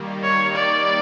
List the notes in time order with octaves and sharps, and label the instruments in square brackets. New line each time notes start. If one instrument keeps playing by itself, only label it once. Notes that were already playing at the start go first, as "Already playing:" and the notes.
Already playing: [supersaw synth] D#3 G3 A#3
[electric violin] C#5
D5